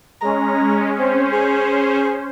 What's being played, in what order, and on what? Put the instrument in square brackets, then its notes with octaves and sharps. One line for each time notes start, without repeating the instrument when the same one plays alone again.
[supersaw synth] G#3 C#4 [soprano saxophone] A#5
[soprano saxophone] C4 [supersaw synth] C#4 C5
[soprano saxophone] G#4